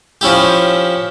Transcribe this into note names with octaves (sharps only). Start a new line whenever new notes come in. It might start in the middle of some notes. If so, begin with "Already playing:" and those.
F3 C#4 E4 G4